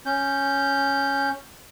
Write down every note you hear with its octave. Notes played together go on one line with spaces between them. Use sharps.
C#4 G6